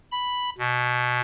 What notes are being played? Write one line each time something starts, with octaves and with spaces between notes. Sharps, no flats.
B5
B2